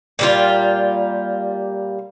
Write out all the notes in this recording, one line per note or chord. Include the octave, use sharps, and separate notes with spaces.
A#2 G3 F4